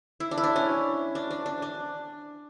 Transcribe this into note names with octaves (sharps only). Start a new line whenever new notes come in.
E4
D4
E4
D4
C#4
D4
D4
D4
D4